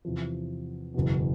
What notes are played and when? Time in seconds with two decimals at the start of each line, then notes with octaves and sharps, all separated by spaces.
0.05 E2 C3 F3
0.94 F#1 E2 B2